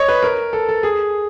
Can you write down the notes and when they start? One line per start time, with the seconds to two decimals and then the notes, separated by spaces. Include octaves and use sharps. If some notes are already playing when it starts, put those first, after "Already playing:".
Already playing: C#5 D#5
0.08 B4
0.23 A#4
0.53 A4
0.69 A4
0.83 G#4